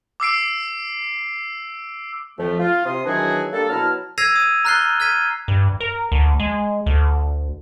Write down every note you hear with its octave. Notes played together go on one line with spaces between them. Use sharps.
D6 E6 C7 D7
F2 F3 A3
F4
C3 C6 D#6
D#3 E3 F#3 D4 F#4 G#4
G3 A#3 D4 A4
B2 F#3 E4 A5 A#5 F6
E6 G#6 A#6 C7 D#7 F7
D#6 D#7
A#5 F6 F#6 A6 C7 G7
F6 G#6 B6 D#7
G2
A#4
D2
G#3
D2